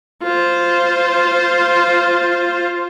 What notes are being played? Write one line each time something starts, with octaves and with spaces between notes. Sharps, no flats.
F4 C5